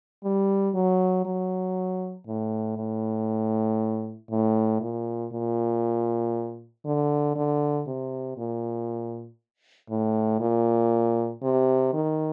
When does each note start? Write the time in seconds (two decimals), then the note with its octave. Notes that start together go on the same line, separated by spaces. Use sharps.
0.24 G3
0.75 F#3
1.25 F#3
2.27 A2
2.78 A2
4.31 A2
4.81 A#2
5.32 A#2
6.85 D3
7.36 D3
7.87 C3
8.37 A#2
9.90 A2
10.40 A#2
11.43 C3
11.94 D#3